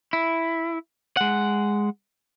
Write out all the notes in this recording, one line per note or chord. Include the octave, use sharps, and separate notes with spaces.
E4
G#3 F#5